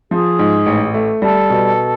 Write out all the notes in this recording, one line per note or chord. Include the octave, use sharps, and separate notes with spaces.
F3 G#4
G#2
A1
A3
G3 A4
B2